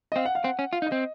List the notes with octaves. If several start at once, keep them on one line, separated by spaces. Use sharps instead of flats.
D#5
C4 F5
F#5
F5
C4 F#5
C#4
F4 F5
D#4
D#5
C4